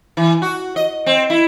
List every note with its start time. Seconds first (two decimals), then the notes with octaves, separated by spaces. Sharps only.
0.17 E3
0.42 F#4
0.76 D#5
1.06 C4
1.30 E4